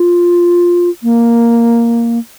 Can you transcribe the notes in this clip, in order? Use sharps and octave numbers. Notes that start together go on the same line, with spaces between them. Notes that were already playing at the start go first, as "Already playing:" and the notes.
Already playing: F4
A#3